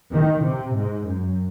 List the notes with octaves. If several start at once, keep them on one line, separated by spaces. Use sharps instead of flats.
D#3
C3
G#2
F#2